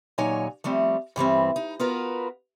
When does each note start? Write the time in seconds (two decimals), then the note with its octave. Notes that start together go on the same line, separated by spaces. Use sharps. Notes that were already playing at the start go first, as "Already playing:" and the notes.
0.18 D#2 A#2 F#3 D#4 C#5 G#5
0.64 F3 G3 A3 C4
1.16 G2 E3 G3 C4
1.56 D#4
1.80 B3 F4 F#4 A#4 B4